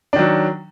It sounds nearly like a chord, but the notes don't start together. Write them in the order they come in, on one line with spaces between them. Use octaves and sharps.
D4 D#3 F#3